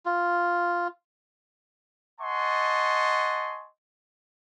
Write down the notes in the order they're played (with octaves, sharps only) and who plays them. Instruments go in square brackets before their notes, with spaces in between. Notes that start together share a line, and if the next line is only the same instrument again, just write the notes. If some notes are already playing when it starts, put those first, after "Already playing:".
[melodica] F4
[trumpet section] D#5 F#5 G#5 A5 C6 C#6